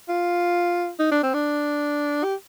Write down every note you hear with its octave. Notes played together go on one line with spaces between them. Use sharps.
F4
D#4
D4
C4
D4
G4